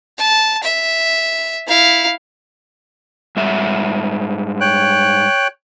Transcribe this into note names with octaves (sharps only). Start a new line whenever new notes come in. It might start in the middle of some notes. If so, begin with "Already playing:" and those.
A5
E5
E4 F5
G#2 G3 E5
C#5 G5 F#6